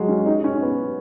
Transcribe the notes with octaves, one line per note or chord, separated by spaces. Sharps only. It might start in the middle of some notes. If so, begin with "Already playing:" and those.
Already playing: F#3 G#3
C#4
D#4
C#4
B3